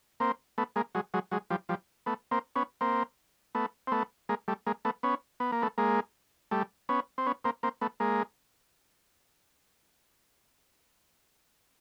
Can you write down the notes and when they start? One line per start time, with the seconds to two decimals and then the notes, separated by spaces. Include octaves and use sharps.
0.20 A#3 C4
0.58 A3 B3
0.76 G#3 A#3
0.95 F#3 G#3
1.14 F#3 G#3
1.31 F#3 G#3
1.50 F3 G3
1.69 F3 G3
2.06 A3 B3
2.31 A#3 C4
2.56 B3 C#4
2.81 A#3 C4
3.55 A3 B3
3.87 C4
3.92 A3 B3
4.29 G#3 A#3
4.48 G3 A3
4.66 G#3 A#3
4.85 A3 B3
5.03 B3 C#4
5.40 B3
5.52 A#3
5.62 A3 B3
5.78 G#3 A#3
6.51 G3 A3
6.89 B3 C#4
7.18 C4
7.26 B3 C#4
7.44 A#3 C4
7.63 A#3 C4
7.81 A3 B3
8.00 G#3 A#3